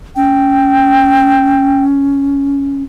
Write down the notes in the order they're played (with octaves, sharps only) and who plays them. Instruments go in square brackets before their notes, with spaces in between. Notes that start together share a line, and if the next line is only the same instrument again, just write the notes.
[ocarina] C#4 [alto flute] G5